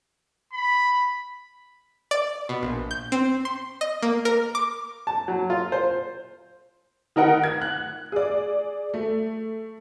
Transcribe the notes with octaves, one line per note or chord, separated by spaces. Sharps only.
B5
D5
B2
A#1
G6
C4
C6
D#5
A#3
A#4
D6
A5
F#3
F4
C5
D#3 D#4 A#4 F#5
G#6
F#6
G#4 D5
A3